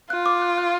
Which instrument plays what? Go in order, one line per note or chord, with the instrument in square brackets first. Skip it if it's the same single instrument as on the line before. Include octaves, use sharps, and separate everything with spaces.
[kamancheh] F4 [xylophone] F#6
[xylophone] D6
F#6
F#6